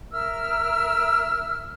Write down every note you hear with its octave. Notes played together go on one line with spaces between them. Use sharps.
A#4 E5 E6 F6